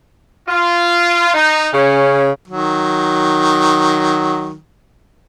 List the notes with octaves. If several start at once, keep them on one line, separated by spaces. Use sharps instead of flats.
F4
D#4
C#3 C#4
D#3 F#3